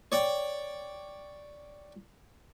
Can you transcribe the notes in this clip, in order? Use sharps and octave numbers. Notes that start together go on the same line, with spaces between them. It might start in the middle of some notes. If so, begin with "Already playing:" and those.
C#5 D5 G5